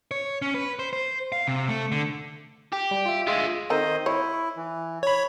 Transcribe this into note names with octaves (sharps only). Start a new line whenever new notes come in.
C#5
C#4
B4
C5
C5
F5
C3
A3
D3
G4
G3
F4 E5
D2 G#3 F4 D#5 E5
D#3 C4 A4 A#4 C5 D#5
E4 C#5
E3
C#5 B5